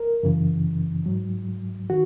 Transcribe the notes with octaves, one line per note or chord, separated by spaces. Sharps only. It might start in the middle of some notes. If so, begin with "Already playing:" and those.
Already playing: A#4
F#2 C#3 E3
G#2 F#3
D#3 F#4